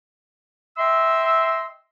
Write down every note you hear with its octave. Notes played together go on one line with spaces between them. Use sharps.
D#5 E5 G5 C6 E6